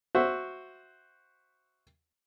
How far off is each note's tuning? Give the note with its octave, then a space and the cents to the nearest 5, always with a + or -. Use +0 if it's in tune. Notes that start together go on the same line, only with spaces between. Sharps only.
F#4 +0 C5 +0 E5 +0